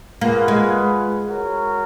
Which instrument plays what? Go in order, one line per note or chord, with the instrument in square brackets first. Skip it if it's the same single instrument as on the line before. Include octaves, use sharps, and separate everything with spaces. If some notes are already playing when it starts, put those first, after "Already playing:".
[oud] A#3 [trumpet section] F4 G#4 B4 F#5
[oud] G#3
[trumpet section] F#4 A#4 C#5